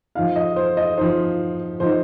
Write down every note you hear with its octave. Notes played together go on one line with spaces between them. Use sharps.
F3 D#4 F5
D#5
C5
D#5
F3 D#4 C5
F3 D#4 C5